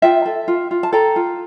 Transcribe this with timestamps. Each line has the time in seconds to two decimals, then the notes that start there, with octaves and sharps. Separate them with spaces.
0.02 F4 E5 G5
0.26 A4
0.48 F4
0.71 F4
0.83 A5
0.93 A4 G5 A#5
1.16 F4